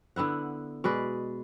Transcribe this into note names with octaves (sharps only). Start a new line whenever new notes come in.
D3 B3 E4 F#5
B2 G#3 B4 D5